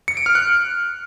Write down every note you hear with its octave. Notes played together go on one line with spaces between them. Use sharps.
C#7
D7
F6
F#6